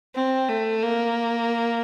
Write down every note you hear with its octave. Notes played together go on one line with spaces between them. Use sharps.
C4
A3
A#3